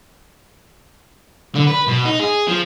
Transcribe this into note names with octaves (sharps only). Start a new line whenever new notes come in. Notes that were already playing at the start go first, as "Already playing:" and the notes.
D3
B4
B2
D#4
G#4
F3